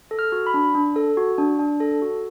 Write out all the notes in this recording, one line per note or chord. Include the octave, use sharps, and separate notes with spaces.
A4
F6
F#4
B5
D4
D4
A4
F#4
D4
D4
A4
F#4